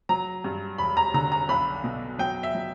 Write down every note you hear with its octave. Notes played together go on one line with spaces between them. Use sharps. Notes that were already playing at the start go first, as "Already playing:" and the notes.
F#3 A#5
G2
E1 B5
A#5
D3 A#5
A#5
B1 B5
B2
F#3 G5
E5
F#3